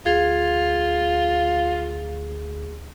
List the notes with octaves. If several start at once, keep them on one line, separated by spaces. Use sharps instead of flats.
D2 F4 G#4